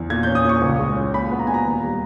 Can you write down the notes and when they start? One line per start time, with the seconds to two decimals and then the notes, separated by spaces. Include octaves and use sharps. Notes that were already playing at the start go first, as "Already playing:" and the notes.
Already playing: E2
0.10 A#2 G#6
0.23 G6
0.27 C#4
0.35 D#6
0.44 A#2 C#6
0.62 C#2
0.79 G#3
0.96 C#4
1.14 A#2 B5
1.32 B3
1.39 A#5
1.47 A#2 G#5
1.54 A#5
1.65 D#2
1.84 G3